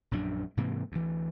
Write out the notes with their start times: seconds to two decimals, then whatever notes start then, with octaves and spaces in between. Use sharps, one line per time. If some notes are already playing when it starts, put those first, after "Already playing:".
0.11 A#1 F#2 E3 D4
0.57 G#2 C3 E3 A#3
0.92 D2 E3